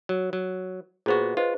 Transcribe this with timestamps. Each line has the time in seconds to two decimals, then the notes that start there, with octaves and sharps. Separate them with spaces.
0.09 F#3
0.33 F#3
1.06 A#2 B3 F#4 G#4 C5 C#6
1.37 F4 B4 C5 D#5